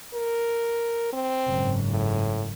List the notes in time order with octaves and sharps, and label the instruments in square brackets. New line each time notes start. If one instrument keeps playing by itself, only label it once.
[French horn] A#4
C4
[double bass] F#1 G#2
[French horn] A2